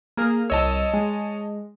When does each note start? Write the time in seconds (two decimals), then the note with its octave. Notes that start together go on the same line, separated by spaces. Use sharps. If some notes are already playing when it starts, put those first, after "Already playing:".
0.17 A#3 G#4 A#4
0.50 C2 C#5 D#5 A5 E6
0.94 G#3